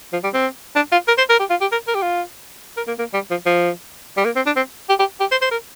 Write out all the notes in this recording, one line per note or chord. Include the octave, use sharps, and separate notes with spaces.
F3
G3
C4
D4
F4
A#4
C5
A#4
G4
F4
G4
A#4
A#4
G4
F4
A#4
A#3
A#3
G3
F3
F3
G3
A#3
C4
D4
C4
G4
G4
G4
C5
C5
A#4